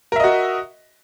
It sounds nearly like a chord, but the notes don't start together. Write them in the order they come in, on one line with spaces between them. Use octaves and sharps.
A#4 E5 D#5 F#4